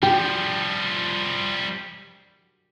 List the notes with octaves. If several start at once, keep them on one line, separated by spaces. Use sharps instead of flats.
F3 G3 G4